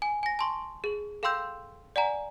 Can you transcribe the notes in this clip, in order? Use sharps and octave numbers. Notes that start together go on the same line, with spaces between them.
G#5
G#5 A#6
A5 C6 C#6
G#4 F#7
A4 F5 G5 C6 E6 G6
D5 F#5 G#5 A#5